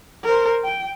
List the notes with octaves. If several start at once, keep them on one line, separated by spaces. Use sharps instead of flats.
A#4 C5
G5